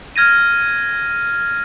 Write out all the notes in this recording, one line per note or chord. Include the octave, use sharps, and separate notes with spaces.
F6 G#6 A#6 D#7